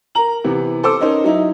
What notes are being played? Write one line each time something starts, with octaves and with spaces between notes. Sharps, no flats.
A#4 A#5 F#7
C3 E3 B3
A4 C5 D6 E6
C#4 D#4 A#4 C5
F#3 D#4 E4